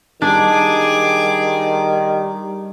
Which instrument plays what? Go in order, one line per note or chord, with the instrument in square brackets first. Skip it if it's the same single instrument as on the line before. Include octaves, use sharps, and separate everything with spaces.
[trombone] D#3 [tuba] G3 [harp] D4 [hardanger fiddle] G#4 D6